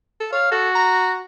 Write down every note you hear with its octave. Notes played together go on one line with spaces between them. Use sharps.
A4
C#5 F5
F#4 A4
A#5